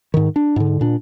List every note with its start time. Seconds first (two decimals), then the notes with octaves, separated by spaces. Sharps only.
0.14 G#2 D#3
0.36 D4
0.56 G#2 D3
0.81 A#2 D4